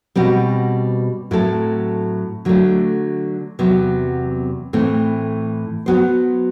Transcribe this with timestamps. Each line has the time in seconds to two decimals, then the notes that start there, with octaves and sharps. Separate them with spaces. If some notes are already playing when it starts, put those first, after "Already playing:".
0.15 B2 G3 C4 F#4 B4
1.31 A2 F#3 C4 E4 A4
2.45 D3 F#3 A3
3.59 E2 C3 F#3 B3
4.73 A2 E3 A3 C4
5.86 F#3 B3 F#4 C5